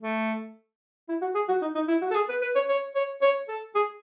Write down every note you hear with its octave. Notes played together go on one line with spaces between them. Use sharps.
A3
E4
F#4
G#4
F#4
D#4
D#4
E4
F#4
A4
G#4
B4
B4
C#5
C#5
C#5
C#5
A4
G#4